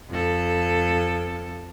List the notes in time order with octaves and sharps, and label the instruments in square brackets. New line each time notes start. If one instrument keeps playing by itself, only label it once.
[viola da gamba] F2 A4